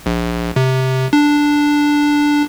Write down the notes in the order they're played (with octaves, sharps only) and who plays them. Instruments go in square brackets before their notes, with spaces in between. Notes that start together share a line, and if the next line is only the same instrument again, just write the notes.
[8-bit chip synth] A#1
C3
D4